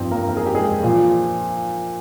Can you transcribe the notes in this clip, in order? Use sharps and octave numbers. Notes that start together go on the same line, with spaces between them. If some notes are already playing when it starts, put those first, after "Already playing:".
Already playing: G2 F3 C4 C5
A#3 A#4
A#4
G#4
G4
G#3 G#4
A#2 F3